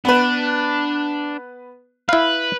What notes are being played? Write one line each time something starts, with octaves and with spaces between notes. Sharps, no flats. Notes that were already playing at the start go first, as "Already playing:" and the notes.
B3 D4 B4
E4 B4 F5